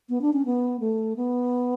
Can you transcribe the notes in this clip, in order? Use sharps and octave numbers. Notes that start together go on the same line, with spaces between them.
B3
D4
C#4
B3
A3
B3